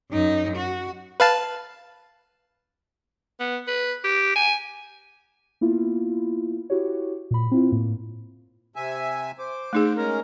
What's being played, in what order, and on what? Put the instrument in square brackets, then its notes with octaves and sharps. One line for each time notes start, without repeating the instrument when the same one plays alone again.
[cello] F#2 D#4
F#4
[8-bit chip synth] B4 F5 A5
[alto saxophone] B3
B4
G4
G#5
[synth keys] A#3 B3 E4 F4
E4 F#4 G4 C#5
A#2 B5
C4 E4 F4
A2 A#3
[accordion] C3 E5 G#5
C5 D6
[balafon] A3 D#4 G#4
[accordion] G#3 C#4 A#4